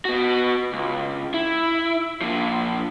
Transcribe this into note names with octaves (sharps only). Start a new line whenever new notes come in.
B3 F#4
C#2
E4
A#2 F3